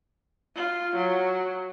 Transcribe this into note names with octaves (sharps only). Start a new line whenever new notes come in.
F4
F#3